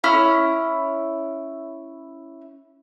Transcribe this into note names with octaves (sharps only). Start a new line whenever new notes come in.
C#4 E4 F6